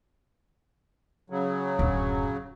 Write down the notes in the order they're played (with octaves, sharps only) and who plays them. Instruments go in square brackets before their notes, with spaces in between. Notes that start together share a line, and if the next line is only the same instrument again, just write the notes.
[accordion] C#3 F#3
[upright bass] D1 F#2